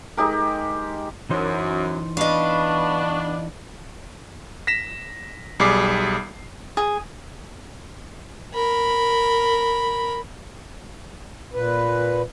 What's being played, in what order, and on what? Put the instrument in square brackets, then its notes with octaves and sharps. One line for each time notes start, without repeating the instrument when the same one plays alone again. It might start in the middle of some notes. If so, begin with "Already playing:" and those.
[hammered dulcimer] G#3 D#4 G4 A#4
[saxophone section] F#2 [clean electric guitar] E3 D#4 C5
[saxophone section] B3 D4 [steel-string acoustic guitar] D#5 F5 [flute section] A5 B5 C#6
[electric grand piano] A#6 B6 E7
B1 G3 G#4 D6 C7
[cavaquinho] G#4
[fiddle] A#4 B5
[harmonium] A#2 B4